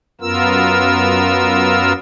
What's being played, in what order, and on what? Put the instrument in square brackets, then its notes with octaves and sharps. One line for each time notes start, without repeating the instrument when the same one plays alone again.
[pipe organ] F#2 B3 F4 A#4 E6